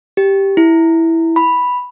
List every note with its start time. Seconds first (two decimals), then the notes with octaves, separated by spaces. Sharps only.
0.17 G4
0.57 E4
1.36 B5